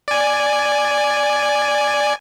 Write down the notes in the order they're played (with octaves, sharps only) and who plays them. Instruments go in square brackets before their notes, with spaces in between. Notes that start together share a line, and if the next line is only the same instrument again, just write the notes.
[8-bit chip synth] D5 G#5